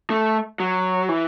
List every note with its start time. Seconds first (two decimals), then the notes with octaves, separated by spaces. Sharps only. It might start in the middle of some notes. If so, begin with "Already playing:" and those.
0.10 A3
0.60 F#3
1.09 E3